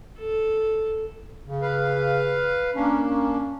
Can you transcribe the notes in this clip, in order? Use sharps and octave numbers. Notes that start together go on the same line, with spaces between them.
A4
C#3
B4 F5
A#3 C#4 D4
C#4